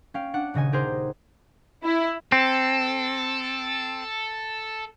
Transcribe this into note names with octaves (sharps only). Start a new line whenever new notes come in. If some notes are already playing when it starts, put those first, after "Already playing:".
C#4 F5 G5
D4 F#5
D#1 C#3 D#5 G#5
D#4 G4 G#4 A#4 C5
E4
C4 A4